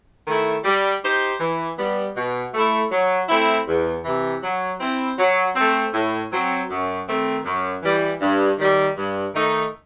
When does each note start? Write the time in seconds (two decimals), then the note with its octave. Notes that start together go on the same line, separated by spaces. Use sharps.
0.26 D#3 A3 E4
0.64 G3
1.02 D#4 G4 C5
1.40 E3
1.78 G3 B3
2.16 B2
2.53 A3 E4
2.91 F#3
3.28 A3 C4 E4
3.67 E2
4.04 C3 E3
4.43 F#3
4.80 C4 E4
5.18 F#3
5.56 A3 C4
5.94 A2
6.31 F#3 C4
6.69 F#2
7.07 D#3 A3 C4
7.45 F#2
7.82 E3 G3
8.21 G2
8.58 D#3 G3
8.96 G2
9.33 D#3 A3 D#4